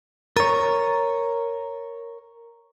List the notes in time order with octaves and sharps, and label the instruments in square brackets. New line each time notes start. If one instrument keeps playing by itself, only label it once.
[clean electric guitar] A#4 C#5 [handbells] A#5 A6